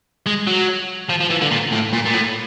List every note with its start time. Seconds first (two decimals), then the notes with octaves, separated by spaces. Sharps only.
0.26 G#3
0.47 F#3
1.09 F3
1.20 F3
1.31 E3
1.41 D3
1.51 A#2
1.72 A2
1.93 A#2
2.05 A#2
2.14 A2